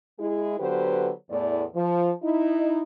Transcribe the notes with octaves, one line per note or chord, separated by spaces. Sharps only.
G#3 E4 G#4
D3 F#3 B3 G4 B4 C5
E2 A2 D5
F3
D#4 E4